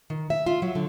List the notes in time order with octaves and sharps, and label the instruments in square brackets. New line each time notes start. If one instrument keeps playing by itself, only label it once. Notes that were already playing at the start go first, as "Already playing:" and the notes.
[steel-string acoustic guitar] D#3
E5
F4
F#3
D3